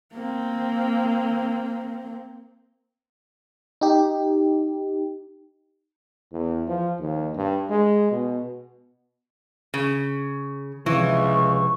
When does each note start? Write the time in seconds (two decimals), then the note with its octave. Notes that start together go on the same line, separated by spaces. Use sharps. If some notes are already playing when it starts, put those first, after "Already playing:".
0.13 A#3 C4
3.81 D#4 G4
6.33 E2
6.68 F3
7.00 D#2
7.36 G2
7.70 G#3
8.11 B2
9.74 C#3
10.86 C#2 C3 E3 F3 C#6